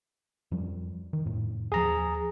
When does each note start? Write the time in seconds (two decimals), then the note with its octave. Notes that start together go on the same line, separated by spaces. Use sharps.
0.51 F2 F3 G3
1.13 D#3
1.25 F2 A2
1.72 D#2 F3 G#4 A#5